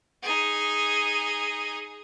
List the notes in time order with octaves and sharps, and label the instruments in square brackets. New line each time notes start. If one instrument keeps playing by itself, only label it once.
[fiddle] D#4 G#4